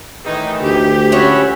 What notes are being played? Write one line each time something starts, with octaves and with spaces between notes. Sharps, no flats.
A2 D#3 E3 D#4
D2 G4
C#4 F4 F#4 G#4 E5 B5